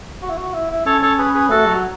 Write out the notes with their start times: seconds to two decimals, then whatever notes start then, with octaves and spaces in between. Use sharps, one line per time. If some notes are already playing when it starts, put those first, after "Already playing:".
0.23 F#4
0.30 E4
0.37 F#4
0.54 E4
0.70 E4
0.86 C#4 A4 C#5
1.02 A4 C#5
1.18 G#4 B4
1.34 G#4 B4
1.49 A3 F#4 A4
1.66 F#3